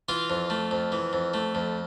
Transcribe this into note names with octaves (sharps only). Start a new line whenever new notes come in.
E3 F4 F5
F2
A3
F2
E3
F2
A3
F2